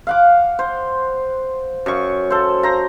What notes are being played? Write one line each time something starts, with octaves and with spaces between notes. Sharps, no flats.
F5 F#5 D6
C5
F#2 C#6
A4 C5
C5 A#5